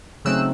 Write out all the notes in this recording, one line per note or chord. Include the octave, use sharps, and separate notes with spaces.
C#3 F#3 A3 C4 D#4 E6 F#6